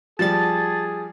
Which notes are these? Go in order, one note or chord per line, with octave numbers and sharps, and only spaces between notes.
F3 G3 G#4 A5 A6